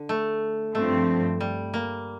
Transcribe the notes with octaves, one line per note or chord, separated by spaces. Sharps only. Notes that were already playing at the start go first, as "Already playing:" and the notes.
Already playing: D3
A3
G2 F3 A3 C4
G3
A#3